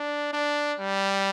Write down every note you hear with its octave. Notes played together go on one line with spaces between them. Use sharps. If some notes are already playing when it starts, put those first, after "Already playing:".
Already playing: D4
D4
G3